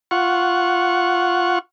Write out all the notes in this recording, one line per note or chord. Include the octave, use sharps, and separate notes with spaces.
F4 F#5 C#6